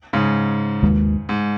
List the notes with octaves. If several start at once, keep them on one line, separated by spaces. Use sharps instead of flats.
G#2 C#3
D#2 D#3 G#3
G#2